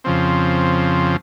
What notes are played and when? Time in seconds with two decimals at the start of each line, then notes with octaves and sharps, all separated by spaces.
0.04 F2 C#3 F3 C4